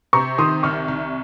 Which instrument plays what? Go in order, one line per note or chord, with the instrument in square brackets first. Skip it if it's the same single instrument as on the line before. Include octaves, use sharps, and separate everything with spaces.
[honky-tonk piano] C3 [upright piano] A#5 C#6
[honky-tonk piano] D#3 [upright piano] C6 D#6
[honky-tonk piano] C2 [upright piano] C#6 F6
[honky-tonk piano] C2